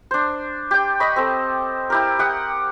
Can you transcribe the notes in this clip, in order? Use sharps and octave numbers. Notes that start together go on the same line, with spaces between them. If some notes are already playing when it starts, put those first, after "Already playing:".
D4 C5
G4 G5
D#5 B5 C#6
C4 A4 C5
E4 G4 A#4
G4 F#5 D#6